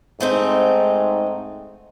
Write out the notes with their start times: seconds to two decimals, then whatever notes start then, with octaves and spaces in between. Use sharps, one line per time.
0.21 G#2 A3 C4 D#4